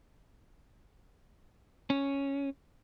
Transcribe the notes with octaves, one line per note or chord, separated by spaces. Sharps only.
C#4